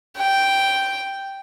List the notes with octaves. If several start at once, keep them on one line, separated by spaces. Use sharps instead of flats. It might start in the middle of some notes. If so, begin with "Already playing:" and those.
G5